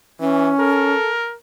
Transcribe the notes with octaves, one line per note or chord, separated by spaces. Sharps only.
E3 C#4
A4 A#4